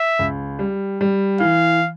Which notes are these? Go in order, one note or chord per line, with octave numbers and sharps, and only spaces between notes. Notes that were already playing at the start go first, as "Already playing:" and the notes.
Already playing: E5
C#2
G3
G3
E3 F5